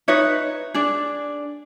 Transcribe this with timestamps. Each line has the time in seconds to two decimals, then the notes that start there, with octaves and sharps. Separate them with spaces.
0.08 D#4 B4 C#5 E5
0.74 D4 G#4